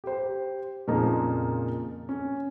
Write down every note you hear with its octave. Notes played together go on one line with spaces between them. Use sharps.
G4 C5
F2 A#2 C#3 F3 A#3 D#4
C#4